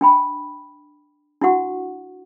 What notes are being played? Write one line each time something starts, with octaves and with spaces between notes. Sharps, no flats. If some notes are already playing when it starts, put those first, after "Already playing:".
D4 G5 B5
D4 E4 F#4 F#5 C#6